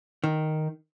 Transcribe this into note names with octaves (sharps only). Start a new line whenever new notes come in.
D#3